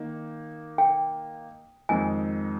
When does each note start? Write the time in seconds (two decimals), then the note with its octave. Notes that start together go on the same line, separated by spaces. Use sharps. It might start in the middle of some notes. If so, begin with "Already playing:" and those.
Already playing: D#3 A#3 D#4
0.78 G5
1.89 F2 D#3 G#3 D#4 G#5